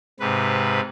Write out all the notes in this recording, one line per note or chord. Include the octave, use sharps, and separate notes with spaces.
G#2 C3 B4